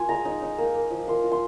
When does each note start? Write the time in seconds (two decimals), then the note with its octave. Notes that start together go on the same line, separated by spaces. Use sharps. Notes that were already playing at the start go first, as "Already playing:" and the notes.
Already playing: A#3 F4 G#5 C6
0.09 G#3 A#5
0.25 D#4
0.42 D#4
0.58 A#3
0.75 A#3
0.91 F3
1.08 A#3 C6
1.24 F4
1.32 C6